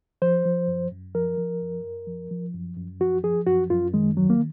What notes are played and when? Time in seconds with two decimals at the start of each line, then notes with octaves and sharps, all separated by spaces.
0.22 F3 C5
0.45 F3
0.68 F#2
0.92 F#2
1.15 F3 A#4
1.38 F3
1.61 F#2
1.84 F#2
2.07 F3
2.31 F3
2.54 F#2
2.77 F#2
3.00 F3 F#4
3.23 F3 G#4
3.46 F#2 F#4
3.70 F#2 F4
3.94 D#3 G#3
4.17 D#2 F#3
4.30 A#3